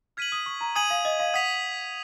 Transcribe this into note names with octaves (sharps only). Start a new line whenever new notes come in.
F6 G#6 B6 D#7 F#7
D#6
C#6
A#5
G#5 D#6 G#6 D#7 F#7
F5
D#5
F5
F#5 D#6 G#6 B6 F7